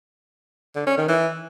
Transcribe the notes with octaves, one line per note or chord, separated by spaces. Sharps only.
D3
C#4
D#3
E3